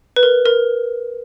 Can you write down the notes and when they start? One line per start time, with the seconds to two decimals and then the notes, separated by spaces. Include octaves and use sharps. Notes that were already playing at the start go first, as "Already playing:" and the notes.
0.16 B4
0.23 A#4
0.46 A#4